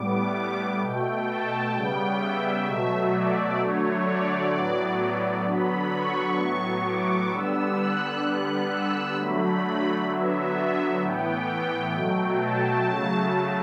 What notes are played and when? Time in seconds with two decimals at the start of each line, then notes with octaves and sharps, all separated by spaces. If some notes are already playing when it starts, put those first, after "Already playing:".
Already playing: A2 G3 B3 D6
0.81 B2 A3 G5
1.27 A5
1.74 C#3 G3 B3 G5
2.20 E5
2.66 B2 F#3 A3
3.12 D5
3.59 D3 F#3 A3 C#5
4.05 D5
4.52 A2 F#3 B3
5.45 D3 F#3 B3 B5
5.92 C#6
6.38 A2 F#3 B3
6.84 D6
7.30 D3 G3 B3 E6
7.78 F#6
8.24 D3 G3 B3 F#6
8.70 E6
9.16 D3 F#3 A3 B5
10.10 D3 F#3 B3 E5
11.02 A2 E3 B3 G5
11.95 B2 F#3 A3
12.42 A5
12.89 C#3 F#3 A3